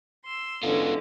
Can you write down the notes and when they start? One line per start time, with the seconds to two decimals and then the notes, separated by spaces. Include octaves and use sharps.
0.24 C6 E6
0.63 D3 E3 G#3 B3 C#4 F4